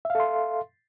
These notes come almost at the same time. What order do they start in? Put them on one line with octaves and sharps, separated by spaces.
E5 F5 A4 C6